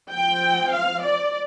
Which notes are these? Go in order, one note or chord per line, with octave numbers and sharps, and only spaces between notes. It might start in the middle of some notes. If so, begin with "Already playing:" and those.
F3 C4 G5
F5
D5